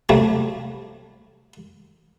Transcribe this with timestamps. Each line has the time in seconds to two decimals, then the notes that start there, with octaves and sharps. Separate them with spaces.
0.09 C3 F#3 G3 A3 A#3